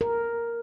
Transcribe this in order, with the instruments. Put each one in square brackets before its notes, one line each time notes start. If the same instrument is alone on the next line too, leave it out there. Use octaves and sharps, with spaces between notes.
[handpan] A#4